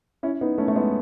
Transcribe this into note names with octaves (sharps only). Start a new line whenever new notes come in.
C#4 E4
B3 D#4
A3 C#4
A3
G#3 B3